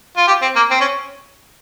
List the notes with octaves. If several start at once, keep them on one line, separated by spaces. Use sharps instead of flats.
F4
G4
C4
A#3
C4
C#4